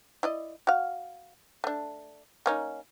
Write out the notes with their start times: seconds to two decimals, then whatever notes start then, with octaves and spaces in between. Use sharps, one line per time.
0.23 E4 D5 D#5
0.67 F#4 F5
1.64 A3 D4
2.46 A#3 C#4 D#4